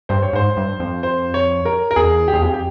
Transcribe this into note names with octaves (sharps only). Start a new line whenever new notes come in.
G2 C5
C#5
G#2 C5
G2
F2
C5
C#5
A#4
A#4
E2 G#4
G4
E2 G#4
F2 G4
G4